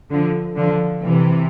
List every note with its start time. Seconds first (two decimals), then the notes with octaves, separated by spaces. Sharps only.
0.11 D3 F3
0.57 D3 F3
1.02 C3 E3